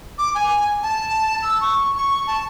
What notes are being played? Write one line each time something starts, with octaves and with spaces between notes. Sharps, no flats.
D6
G#5
A5
E6
C#6
C#6
A5